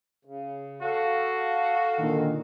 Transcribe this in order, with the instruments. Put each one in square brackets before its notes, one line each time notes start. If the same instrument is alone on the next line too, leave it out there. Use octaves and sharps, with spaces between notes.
[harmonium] C#3
[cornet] F#4 [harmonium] A4 F5
[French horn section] A#2 D3 D#3